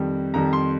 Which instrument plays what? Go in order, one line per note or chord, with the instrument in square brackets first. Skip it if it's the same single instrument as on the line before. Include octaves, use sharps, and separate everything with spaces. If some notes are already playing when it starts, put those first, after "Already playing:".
Already playing: [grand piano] F2 D#3 G3
F2 D#3 G3 A#5
C6